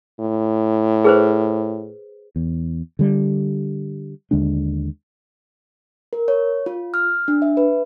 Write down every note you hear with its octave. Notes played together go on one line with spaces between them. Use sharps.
A2
G#4 B4 C5
E2
D3 G3
D#2 D3 G#3 D4
A#4
C#5
F4
F6
D4
E5
B4